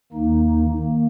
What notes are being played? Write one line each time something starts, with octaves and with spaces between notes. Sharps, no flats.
D#2 D#3 A#3 D#4
D#3 A#3